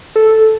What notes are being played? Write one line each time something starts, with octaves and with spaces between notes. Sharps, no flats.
A4